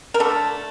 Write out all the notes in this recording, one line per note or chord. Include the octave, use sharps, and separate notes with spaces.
A#4
D3 A3 A4